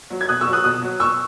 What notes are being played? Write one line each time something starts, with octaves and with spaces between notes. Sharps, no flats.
F#3
G#6
B2 D#6 F#6
C#6 E6
F#3
D#6 F#6
B2 D#6 F#6
F#3
B2 C#6 E6